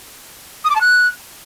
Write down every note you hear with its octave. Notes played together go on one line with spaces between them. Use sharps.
D#6
D6
A5
F#6